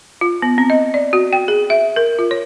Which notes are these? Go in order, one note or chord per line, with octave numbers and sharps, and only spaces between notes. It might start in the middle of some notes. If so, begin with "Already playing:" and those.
F4
B3
C4
D#5
D5
F#4
G5
G#4
E5
A#4
F4
C#5